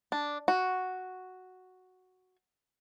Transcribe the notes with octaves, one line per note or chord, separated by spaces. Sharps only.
D4
F#4